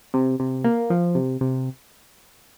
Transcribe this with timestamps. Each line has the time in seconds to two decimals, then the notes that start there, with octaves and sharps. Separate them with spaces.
0.14 C3
0.40 C3
0.64 A#3
0.90 F3
1.15 C3
1.41 C3